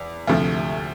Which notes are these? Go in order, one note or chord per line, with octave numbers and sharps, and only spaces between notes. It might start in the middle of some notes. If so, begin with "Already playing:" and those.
Already playing: E2
D2 C3 F3 A3